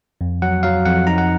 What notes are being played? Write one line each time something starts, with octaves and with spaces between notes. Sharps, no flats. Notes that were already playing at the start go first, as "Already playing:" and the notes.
F2
F#3 F#5
F#3 F5
F2 F#5
D#4 A#5
F#5